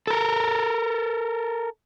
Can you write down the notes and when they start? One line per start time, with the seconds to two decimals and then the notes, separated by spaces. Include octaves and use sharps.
0.07 A4 A#4